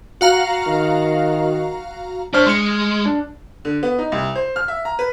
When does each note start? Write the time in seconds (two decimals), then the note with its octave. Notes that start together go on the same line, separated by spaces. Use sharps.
0.21 F#4 F5 A#5
0.68 D#3
2.34 D4 E4 C5 C#5 F6
2.46 G#3 C6 C#7
3.06 D4
3.65 D3
3.83 B3
3.99 D#4
4.12 C2
4.35 C5
4.56 F6
4.68 E5
4.85 A#5
4.99 B4